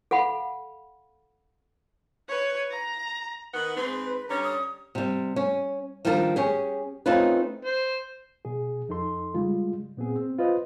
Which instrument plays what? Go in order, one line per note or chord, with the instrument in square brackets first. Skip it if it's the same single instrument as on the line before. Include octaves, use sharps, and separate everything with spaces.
[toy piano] A4 F5 F#5 B5
[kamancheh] B4 C#5
A#5
[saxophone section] D#3 B3 F#5
[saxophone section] G#2 C4 [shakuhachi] B4
[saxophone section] D3 G3 C#4 [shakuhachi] A#5
[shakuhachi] D#6
[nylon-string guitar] C3 G3
C#4
D#3 F3 G3 D4 A4 A#4
C#4 G4 G#4
A3 C4 C#4 D#4 F4 B4
[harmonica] C5
[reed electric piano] B2 G#4
F2 D#4 A4 C6
C#3 G3 G#3 F4
A#2 B3 C4 G#4
C4
F4 B4 C5 D#5